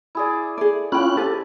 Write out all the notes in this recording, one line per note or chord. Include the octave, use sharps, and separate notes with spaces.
E4 G#4 D5
A3 G#4 D5
C#4 E4 F4 G5 B5 F#6
G4 A4 C5 G#5